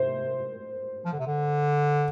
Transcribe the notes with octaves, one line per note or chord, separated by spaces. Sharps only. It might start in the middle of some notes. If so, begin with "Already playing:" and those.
Already playing: C3 C5
F3
D3
C3
D3